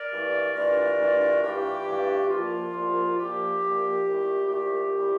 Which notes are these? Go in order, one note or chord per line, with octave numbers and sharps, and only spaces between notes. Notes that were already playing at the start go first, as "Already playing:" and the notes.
Already playing: A#4 D5
G2 E3 A3 E4
G2 E3 A3 D4 F4 A#4 D5
G2 E3 A3 D4 F4
G2 E3 A3 D4 F4 G4
G2 E3 A3 D4 F4
C2 A#2 F3 A#3 F4
C2 A#2 F3 A#3
C2 A#2 F3 A#3 G4
C2 A#2 F3 A#3
C2 A#2 A3 E4
C2 A#2 A3 E4 G4
C2 A#2 A3 E4